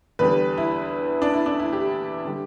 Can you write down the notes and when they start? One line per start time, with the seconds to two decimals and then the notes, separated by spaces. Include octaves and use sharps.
0.19 E2 D3 G3 B4
0.58 E4
1.22 D4
1.34 E4
1.46 D4
1.59 E4
1.73 G4
2.25 D3 G3